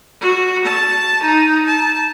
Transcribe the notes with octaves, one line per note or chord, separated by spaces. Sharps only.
F#4
A5
D#4
A5